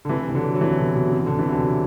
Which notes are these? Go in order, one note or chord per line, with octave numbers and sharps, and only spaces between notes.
D3
C3 E3
E3
D3 F#3
F#3
C3 E3
B2 D3
B2
C3
B2 D3
C3 E3
D3 F#3